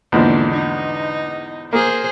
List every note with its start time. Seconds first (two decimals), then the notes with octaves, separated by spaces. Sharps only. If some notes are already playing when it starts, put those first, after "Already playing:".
0.12 E2 G#2 D3 F3 A#3
0.53 D#4
1.73 A#3 G#4 C5